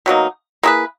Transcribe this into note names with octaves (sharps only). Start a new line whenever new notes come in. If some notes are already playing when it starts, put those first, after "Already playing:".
B2 F#3 A#3 D#4
A#3 E4 G#4 B4